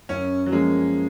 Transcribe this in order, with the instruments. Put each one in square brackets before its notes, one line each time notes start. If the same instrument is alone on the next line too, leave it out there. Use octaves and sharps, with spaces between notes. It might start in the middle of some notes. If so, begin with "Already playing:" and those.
[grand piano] F#2 [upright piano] C#4
[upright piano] F#3
[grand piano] F3 A#3 C#4 [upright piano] G#3